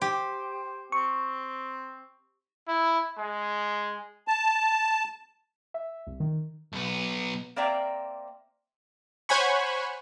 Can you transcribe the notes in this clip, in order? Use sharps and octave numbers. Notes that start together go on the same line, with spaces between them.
G4 C5
C4 C#6
E4
G#3
A5
E5
C2
D#3
B1 B3
A#3 C4 D5 E5 G5 A#5
C5 C#5 F#5 G#5 B5 C#6